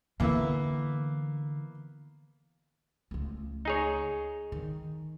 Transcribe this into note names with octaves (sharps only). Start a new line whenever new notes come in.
D3 E3 A#3 B3 E5
C#2 A3
D#4 G#4 C#5
D#3